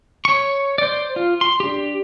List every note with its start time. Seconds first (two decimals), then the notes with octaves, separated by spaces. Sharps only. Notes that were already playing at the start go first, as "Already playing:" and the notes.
0.25 C#5 C#6
0.78 C5 D5
1.16 F4
1.41 C6
1.60 D4 G4